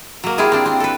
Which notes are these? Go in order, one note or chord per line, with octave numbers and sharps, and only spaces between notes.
F#3 A#3
E4 F4 G4 G#4
C4 D4
C4
A4 B4